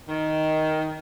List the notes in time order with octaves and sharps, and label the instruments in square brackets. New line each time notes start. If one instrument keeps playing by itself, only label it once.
[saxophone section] D#3